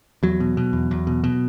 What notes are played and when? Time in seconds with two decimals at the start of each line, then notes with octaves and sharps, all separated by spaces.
0.23 E2 F#3
0.40 B2
0.57 B2
0.73 E2
0.91 E2
1.07 B2
1.24 B2